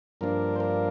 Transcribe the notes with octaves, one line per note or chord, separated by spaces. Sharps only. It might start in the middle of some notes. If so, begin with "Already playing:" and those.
G2 F3 A#3 D4 A#4
C5
A#4